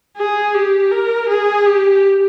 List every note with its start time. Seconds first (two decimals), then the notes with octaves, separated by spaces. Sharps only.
0.17 G#4
0.54 G4
0.92 A#4
1.29 G#4
1.66 G4